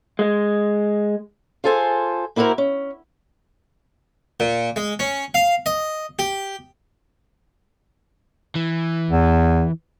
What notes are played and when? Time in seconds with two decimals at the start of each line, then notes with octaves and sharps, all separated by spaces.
0.19 G#3
1.64 F4 G#4 A4 C5 G#5
2.36 A#3 E4 F#4 G#4 A#4 C5
2.58 C#4
4.40 A#2
4.76 G#3
4.99 C#4
5.34 F5
5.66 D#5
6.19 G4
8.55 E3
9.11 E2